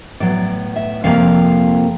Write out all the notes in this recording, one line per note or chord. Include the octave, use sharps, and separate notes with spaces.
A2 F#3 B3 D5
E5
F2 C3 F3 A#3 F5